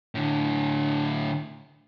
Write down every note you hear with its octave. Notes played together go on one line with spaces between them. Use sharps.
A2 D3